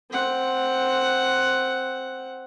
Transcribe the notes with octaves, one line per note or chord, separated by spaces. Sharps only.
C4 F#5